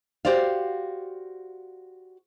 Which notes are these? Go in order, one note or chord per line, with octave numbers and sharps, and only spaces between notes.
F#4 G4 C5 D5 F5